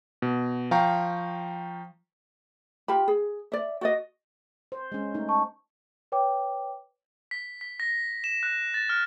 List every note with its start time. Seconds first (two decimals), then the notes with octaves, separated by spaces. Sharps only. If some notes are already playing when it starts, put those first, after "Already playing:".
0.22 B2
0.71 F3 F5 G5 A#5 C#6
2.88 F4 G4 B5
3.08 G#4
3.52 D5 E5
3.81 F#4 D5 D#5
4.72 C5
4.92 G#3 C#4
5.14 A3 D#4
5.28 A5 C#6
6.12 B4 C#5 G5 D6
7.31 B6
7.61 B6
7.80 A#6
8.24 E7
8.43 F#6
8.74 A6
8.89 F6